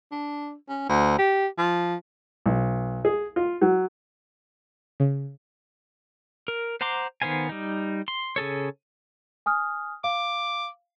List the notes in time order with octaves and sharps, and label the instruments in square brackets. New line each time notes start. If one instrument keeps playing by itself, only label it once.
[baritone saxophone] D4
C#4
D2
G4
F3
[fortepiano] B1
G#4
F4
F#3
[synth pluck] C#3
[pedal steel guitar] A#4
C5 F#5 A#5 C6 D6
D#3 B3 C5 F5 G#5
G3 D#4
C6
C#3 G#4 A4 C#5
[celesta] G#5 D#6 F6
[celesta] F5 [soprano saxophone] D6